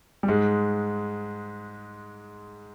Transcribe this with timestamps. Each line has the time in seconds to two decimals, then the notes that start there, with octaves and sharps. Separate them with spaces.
0.23 G3
0.28 G#2 G#3